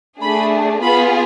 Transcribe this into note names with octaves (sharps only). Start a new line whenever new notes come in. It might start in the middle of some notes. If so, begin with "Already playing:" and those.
A3 D4 G#4 B5
B3 F4 G#4 B5